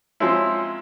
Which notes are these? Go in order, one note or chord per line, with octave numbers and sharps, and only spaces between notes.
F3 F#3 G#3 C4 C#4 E4